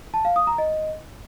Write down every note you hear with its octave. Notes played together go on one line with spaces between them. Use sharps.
A5
F5
D#6
A#5
D#5